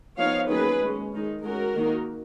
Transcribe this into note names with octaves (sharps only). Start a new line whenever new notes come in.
F3 B3 D#4 C#5 F5
D#3 F#3 A#3 C#4 G#4 B4
G#3 C#4
D#3 G#3 D#4
G#3 C#4 F#4 A#4
D#3 A#3 D#4